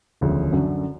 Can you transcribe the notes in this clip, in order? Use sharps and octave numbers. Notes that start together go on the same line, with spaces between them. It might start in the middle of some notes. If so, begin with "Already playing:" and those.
E1 D2 C#3 F3
F#2 D3 F#3